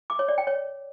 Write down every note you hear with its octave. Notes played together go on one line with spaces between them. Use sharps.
D6
C#5
D5
G5
C#5